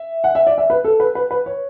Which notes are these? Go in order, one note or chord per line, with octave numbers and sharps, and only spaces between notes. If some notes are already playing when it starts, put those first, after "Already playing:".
Already playing: E5
F#5
E5
D5
E5
B4
A4
B4
B4
B4
C#5